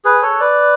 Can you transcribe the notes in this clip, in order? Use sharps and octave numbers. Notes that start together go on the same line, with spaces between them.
G#4 B4
A4 C#5
B4 D5